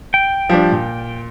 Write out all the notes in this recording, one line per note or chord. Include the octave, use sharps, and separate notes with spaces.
G5
F3 G3 D4
A#2